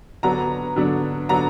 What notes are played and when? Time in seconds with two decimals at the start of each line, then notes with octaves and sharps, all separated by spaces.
0.23 D3 F#3 B3 D4 A#5
0.76 D3 F#3 B3 D4
1.29 D3 F#3 B3 D4 A#5